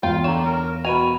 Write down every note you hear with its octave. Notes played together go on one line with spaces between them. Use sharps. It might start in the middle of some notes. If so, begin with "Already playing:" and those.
E2 F4 F5 G5
D3 C#5 A#5 E7
A#4
B2 G#5 B5 D#7 F7